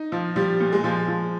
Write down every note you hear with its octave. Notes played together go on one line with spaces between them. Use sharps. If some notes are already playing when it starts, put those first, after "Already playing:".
Already playing: D#4
F3
F3 G3
A#2
G#3
F3
F3